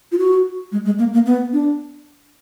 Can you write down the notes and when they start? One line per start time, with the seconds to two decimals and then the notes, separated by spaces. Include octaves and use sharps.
0.12 F4
0.18 F#4
0.72 G#3
0.85 G#3
0.99 A#3
1.13 A#3
1.26 B3
1.53 D4